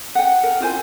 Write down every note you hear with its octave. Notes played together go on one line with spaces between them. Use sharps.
F#5 G5
A#4
E4 F4 C5 G#5